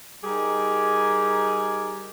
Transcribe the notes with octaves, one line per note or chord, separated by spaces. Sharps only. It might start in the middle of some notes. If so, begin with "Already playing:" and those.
G3 D#4 G4 G#4 A#4